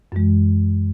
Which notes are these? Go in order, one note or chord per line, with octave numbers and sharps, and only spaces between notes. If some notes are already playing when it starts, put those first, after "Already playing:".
F#2 E3 G#3